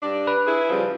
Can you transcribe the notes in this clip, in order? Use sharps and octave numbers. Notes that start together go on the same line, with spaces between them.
G2 D4
B4
E4 G#4
C#3 F3 G3